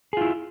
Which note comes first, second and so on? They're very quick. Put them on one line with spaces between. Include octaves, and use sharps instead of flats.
G#4 F4 E4